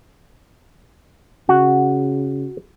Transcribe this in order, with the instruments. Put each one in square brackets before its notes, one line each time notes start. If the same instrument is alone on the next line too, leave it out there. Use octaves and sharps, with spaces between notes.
[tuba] C#3 [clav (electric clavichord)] F#4